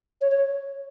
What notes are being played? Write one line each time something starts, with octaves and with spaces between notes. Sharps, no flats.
C#5
C#5